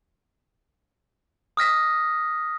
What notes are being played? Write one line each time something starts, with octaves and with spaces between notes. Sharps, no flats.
D#6 F6 A#6 B6